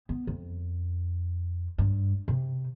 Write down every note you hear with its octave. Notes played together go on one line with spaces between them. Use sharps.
B3
F2
G2
C3